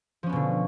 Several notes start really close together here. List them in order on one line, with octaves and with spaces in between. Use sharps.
F3 C#4 B3 B2 D3